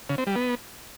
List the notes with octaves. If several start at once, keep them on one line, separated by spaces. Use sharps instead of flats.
C#3
C4
G3
B3